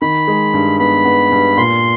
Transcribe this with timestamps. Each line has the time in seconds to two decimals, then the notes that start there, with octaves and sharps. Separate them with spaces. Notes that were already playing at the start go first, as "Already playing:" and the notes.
0.02 D#3 B5
0.28 G#3
0.54 G2
0.80 B3 B5
1.05 B3
1.32 G2
1.57 A#2 C6